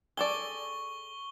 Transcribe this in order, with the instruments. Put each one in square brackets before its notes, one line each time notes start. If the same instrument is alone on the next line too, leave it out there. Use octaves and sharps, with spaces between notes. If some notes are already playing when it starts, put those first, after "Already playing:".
[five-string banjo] G#4 A4 D5 [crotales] C#6 G7